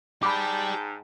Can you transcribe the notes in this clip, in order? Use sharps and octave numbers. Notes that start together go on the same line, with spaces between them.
G#2 G4 D5 G5 A5 B5 D6